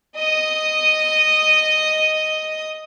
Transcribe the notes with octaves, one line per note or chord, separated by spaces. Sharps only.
D#5 D#6